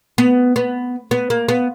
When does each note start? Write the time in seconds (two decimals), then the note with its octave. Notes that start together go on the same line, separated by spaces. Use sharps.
0.18 B3
0.56 B3
1.11 B3
1.30 A#3
1.48 B3